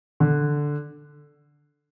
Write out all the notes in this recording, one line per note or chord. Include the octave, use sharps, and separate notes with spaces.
D3